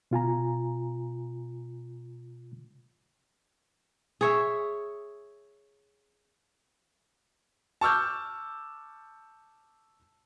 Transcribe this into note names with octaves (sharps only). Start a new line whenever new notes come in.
B2 F4 G#5 A#5
G#4 C#5 E5
A5 C#6 D6 E6 F6 G6